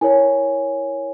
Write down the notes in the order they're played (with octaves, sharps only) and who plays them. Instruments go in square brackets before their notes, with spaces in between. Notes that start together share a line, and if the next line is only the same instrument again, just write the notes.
[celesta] E4 A#4 C#5 G#5